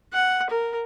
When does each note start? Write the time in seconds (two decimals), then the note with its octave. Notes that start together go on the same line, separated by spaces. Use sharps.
0.13 F#5
0.50 A#4